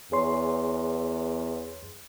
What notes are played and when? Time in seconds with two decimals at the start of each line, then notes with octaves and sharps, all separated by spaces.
0.12 E2 G#4 C#5 C6